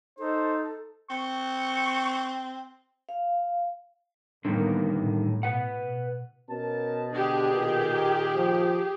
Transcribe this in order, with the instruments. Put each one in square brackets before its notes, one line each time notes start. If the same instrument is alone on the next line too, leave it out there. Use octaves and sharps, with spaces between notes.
[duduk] D#4 [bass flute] A4 [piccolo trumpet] C5
[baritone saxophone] C4 [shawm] C#6
[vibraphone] F5
[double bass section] A2 A#3 B3 [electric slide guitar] D3 D#3 G3
[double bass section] A2
[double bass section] B2 [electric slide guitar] B4 F#5
[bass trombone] B2 [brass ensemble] C#4 A#4 A5
[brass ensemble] D3 D4 [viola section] G4 G#4
[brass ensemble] A#2 D#3
[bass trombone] F3